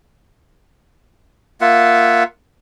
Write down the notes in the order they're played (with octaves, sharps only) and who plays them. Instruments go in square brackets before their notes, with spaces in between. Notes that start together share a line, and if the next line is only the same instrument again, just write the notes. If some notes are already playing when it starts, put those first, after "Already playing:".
[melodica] A#3 F4 E5 F#5